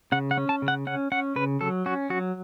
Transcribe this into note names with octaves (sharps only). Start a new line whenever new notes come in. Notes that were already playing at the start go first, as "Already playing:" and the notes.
C#3 F#5
F#5
C#4
A5
C#3
F#5
C#4 F#5
C#4 F#5
C#3 B4
F#3 A4
C#4 F#4
F#3 F#4